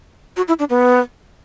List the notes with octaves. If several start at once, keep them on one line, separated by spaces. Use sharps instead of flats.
F#4
E4
D4
B3